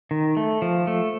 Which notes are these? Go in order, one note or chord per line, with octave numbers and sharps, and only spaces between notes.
D#3
A3
F3
A3